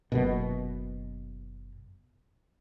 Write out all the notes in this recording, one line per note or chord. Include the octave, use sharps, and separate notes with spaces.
F#1 F#2 B2